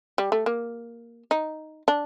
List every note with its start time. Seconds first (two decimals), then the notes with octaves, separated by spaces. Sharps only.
0.18 G3
0.32 A3
0.46 A#3
1.31 D#4
1.88 D4